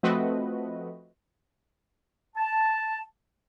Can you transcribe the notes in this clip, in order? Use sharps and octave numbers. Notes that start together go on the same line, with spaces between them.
F3 A3 C4 F#4 B4 D#5
A5